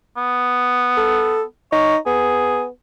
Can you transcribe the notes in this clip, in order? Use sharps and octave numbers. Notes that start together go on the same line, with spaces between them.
B3
A4
D#4 C#5
B3 G#4